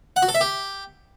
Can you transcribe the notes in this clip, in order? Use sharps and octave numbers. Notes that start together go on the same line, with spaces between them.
F#5
F#4
A4
E5
G4